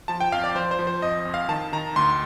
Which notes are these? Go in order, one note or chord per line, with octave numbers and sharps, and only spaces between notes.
F3 A5
G5
F2 F5
D5
F3 C5
C5
F3
C5
F2 D#5
F2
F5
D#3 A5
D#3 A#5
D2 C6